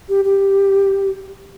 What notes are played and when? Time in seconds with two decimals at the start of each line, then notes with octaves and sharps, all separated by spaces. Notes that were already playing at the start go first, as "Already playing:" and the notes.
0.09 G4
0.25 G4